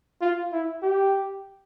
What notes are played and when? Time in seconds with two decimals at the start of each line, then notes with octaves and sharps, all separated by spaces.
0.22 F4
0.52 E4
0.82 G4